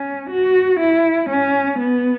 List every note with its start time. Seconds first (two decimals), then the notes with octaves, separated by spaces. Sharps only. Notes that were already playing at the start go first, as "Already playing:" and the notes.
Already playing: C#4
0.30 F#4
0.80 E4
1.30 C#4
1.79 B3